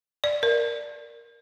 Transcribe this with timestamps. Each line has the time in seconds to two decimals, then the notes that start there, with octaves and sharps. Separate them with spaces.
0.24 D5
0.43 A#4